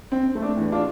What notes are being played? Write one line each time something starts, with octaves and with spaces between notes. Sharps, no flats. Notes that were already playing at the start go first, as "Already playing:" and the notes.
C4
A3
D4
E2
D4 F4